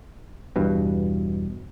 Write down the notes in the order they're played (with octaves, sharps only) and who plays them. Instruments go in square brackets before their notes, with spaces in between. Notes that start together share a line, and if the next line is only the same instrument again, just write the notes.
[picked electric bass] E2 G2 B2